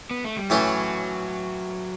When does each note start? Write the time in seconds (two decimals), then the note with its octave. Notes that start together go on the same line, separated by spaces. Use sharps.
0.11 B3
0.24 A3
0.37 G3
0.50 A2 E3 F#3 A3 C#4